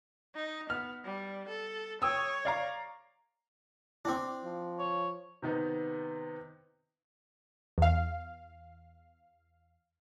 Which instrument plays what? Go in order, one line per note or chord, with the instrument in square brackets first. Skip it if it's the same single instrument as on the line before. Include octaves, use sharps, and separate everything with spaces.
[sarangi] D#4
[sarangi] B3 [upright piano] F6
[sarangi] G3
A4
[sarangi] C#5 [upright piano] G5 D#6 E6
[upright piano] D5 F5 A#5
[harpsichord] C4 D4 [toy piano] E4 G5 D6
[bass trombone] F3
[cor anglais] C#5
[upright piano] C3 D#3 B3 D#4
[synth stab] E2 F5